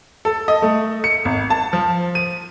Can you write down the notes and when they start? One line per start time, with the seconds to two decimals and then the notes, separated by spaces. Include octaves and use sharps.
0.25 A4
0.48 D#5
0.62 A3
1.04 C#7
1.25 G#1
1.50 A5
1.73 F3
2.15 D#7